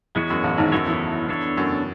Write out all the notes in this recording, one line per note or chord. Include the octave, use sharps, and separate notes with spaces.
E2 G#3 B3 F#4 C#5
F#2
A1 A2
G#1 G#2
F#2 B3 E4 A4 C#5
E2
B3 D4 A4 C#5
F#2